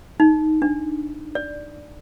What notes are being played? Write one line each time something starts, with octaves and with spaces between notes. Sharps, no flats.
D#4
D4
D5